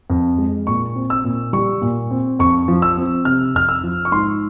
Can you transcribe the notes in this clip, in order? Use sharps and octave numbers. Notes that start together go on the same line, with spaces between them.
F2
G#3
A#2 C#6
C4
E6
A#2
G3 C#6
A#2
C4
F2 C#6
F3
E6
C4
C3 F6
F2 F6
E6
F3
C#6
G#2 C6